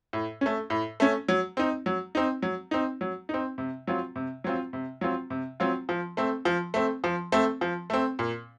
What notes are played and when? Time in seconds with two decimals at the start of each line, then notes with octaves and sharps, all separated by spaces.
0.13 A2
0.41 A3 C#4
0.70 A2
1.00 A3 C#4
1.29 F#3
1.57 C4 D#4
1.86 F#3
2.15 C4 D#4
2.43 F#3
2.71 C4 D#4
3.01 F#3
3.29 C4 D#4
3.58 C3
3.87 F#3 C4 F4
4.16 C3
4.44 F#3 C4 F4
4.73 C3
5.01 F#3 C4 F4
5.30 C3
5.60 F#3 C4 F4
5.89 F3
6.17 A3 C4
6.45 F3
6.74 A3 C4
7.04 F3
7.32 A3 C4
7.61 F3
7.90 A3 C4
8.19 A#2